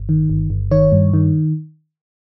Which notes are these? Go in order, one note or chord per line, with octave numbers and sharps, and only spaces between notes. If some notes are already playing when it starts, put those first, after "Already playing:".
Already playing: G1
D#3
G1
G1
D#3 C#5
G2
D#3